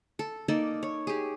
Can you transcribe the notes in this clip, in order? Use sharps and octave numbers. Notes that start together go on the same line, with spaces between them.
A4
A#3 D#4 A4 D5
C#5
G4 G#4